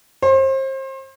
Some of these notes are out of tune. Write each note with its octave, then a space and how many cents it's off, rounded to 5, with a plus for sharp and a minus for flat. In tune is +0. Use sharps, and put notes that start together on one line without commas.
C5 +35